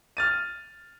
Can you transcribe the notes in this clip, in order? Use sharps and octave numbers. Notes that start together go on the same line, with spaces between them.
F6 A6 D#7